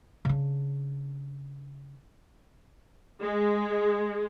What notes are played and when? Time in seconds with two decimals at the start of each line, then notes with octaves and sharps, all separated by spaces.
0.25 C#3 D4
3.21 G#3